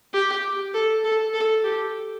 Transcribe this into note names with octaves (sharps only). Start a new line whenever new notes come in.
G4
A4
A4
A4
G4